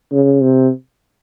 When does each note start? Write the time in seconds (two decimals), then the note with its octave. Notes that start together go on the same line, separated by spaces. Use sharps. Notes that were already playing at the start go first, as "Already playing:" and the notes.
0.12 C#3
0.42 C3